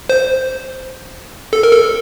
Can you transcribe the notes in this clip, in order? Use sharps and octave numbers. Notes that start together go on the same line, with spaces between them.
C5
A4
A#4
A4